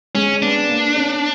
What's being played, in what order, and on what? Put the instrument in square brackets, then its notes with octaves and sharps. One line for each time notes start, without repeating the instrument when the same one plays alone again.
[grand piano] G#3 [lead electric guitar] C#4
[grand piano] B3 [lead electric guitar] D4
[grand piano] A#3
C#4